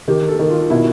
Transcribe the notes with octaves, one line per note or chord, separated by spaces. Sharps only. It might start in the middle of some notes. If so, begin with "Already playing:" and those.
D#3 G4
A4
D#3
F4
B2 E4